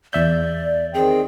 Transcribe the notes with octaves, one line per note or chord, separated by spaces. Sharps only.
E2 D5 E5 G6
D#3 C4 G#4 G5